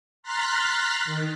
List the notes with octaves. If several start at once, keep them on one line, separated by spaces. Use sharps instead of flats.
A#5 C6 F6 F#6 A6 B6
D#3